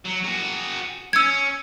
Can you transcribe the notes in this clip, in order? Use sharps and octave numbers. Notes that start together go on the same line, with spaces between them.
F#3
F#4 G#4
C#4 E6 G#6